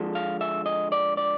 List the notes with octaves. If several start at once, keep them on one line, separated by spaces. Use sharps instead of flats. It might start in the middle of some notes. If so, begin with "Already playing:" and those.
Already playing: D3 F3 G#3
F5
E5
D#5
D5
D5